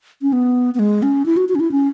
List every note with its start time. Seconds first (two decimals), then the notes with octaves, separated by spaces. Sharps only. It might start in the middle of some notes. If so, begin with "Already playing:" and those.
0.22 C#4
0.33 B3
0.74 B3
0.79 G#3
1.03 C#4
1.26 E4
1.37 F#4
1.49 F#4
1.55 C#4
1.60 E4
1.72 C#4